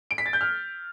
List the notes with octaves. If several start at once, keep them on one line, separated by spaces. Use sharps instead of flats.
D7
B6
A6
G6
F6